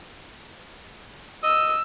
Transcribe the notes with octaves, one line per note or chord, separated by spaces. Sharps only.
D#5 E6